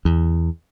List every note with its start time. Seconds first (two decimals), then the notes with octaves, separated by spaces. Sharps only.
0.05 E2